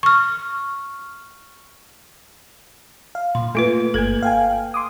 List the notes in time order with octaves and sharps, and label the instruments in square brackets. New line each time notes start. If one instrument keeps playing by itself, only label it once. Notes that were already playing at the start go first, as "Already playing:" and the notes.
[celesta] C#6 F6
[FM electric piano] F5
[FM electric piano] A#2 [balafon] C6
[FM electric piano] A3 [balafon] A#3 F4 B4
[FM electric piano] G1 G#6 [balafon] A#3 A4
[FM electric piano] F5 G5 G#5
C6 D6 D#6